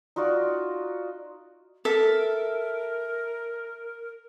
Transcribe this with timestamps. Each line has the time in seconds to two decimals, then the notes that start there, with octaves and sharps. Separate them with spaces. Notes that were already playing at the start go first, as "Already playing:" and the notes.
0.16 D#4 F4 F#4 D5
1.85 A4 A#4 E5